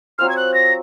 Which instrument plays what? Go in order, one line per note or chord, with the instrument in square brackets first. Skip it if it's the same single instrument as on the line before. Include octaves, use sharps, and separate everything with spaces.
[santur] F#3 C4 F4 C5 [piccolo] F6
[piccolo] G#6
F#6
A#6